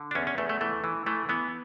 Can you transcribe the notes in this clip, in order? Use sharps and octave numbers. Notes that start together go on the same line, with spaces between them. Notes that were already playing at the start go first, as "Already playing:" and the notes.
Already playing: D3
D4
E2 C#4
C#4
E2 A3
A3
E3 A3
E3
E3 A3
E3 B3